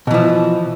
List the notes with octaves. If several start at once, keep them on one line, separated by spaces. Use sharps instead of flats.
B2 E3 F3